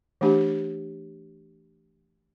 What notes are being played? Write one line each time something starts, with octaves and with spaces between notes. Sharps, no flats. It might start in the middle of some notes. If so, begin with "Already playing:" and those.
E3 A3 D4 G4